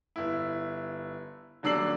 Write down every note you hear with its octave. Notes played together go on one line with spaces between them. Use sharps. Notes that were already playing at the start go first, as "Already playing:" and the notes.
G1 E4
D#1 F#3 D4 E6 C7 F#7